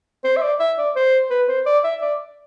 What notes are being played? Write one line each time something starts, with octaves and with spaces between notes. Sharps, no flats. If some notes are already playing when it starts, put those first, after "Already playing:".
C5
E5
D5
E5
D5
C5
B4
C5
D5
E5
D5